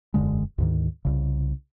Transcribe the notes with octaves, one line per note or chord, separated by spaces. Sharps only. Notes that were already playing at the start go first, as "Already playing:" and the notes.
E1 F#2 D3 G#3
D2 G#2 D#3
C2 C#3